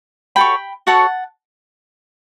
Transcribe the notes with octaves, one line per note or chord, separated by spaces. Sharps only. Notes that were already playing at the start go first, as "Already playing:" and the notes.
F#4 A4 C#5 G5 B5
F#4 A4 C#5 F#5 A5